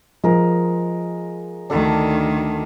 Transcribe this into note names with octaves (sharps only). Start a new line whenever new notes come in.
F3 G#3 A#4
D2 D#3 D4 A4 C#6